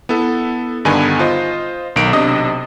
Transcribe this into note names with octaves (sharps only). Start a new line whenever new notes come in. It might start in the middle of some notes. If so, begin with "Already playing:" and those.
B3 E4 A4
G2 D3 D#3 B3 G#5
F4 C5 D#5
B1 D#3 D7
B1 C3 D4 D#5 D#6